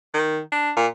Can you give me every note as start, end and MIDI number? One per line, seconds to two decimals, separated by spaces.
0.14 0.39 51
0.52 0.71 62
0.76 0.87 46